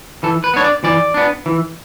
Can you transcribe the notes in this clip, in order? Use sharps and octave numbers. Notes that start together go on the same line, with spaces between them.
E3 A4
B4
B3 D4 C#5
D5
E3 D5
B3 D4
E3